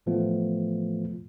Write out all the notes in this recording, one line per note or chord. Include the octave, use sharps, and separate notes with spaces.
A2 E3 F3 A3 B3 F4